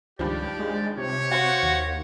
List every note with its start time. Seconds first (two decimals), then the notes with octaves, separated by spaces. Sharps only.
0.19 C#2 G2 D#3 F3 G4 D5
0.59 G#3
0.98 C3 G4 C#5
1.31 F#4 C5 F5 F#5
1.63 D#2